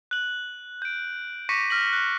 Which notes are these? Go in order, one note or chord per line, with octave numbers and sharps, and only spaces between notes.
F#6 F#7
G6 D7
C#6 D6 A#6 B6 C#7 D#7
F6 A#6 B6 F#7
F#6